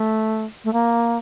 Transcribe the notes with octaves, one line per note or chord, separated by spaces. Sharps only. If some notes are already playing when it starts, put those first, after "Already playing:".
Already playing: A3
A3
A#3